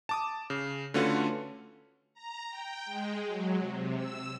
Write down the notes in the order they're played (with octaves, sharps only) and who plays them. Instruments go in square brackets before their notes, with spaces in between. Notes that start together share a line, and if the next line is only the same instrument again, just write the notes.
[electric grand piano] A5 D6 D#6
C#3
D3 A3 C#4 F4 F#4 B4
[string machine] A#5
G5
G#3
F#3
C3
E6